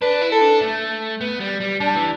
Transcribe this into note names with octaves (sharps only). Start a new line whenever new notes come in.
D4 B4
E4
A4
D4
A3
B3
G3
G3
G3 D4
E3